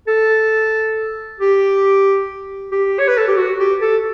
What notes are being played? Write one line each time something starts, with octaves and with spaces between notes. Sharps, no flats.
A4
G4
G4
C#5
B4
A4
G4
F#4
G4
A4